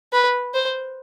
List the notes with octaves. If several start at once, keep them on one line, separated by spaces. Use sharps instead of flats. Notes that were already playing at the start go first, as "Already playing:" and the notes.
B4
C5